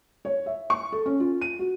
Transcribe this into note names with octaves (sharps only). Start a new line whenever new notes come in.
C#5
E5
C#6
A4
C#4
F4
D#7
F#4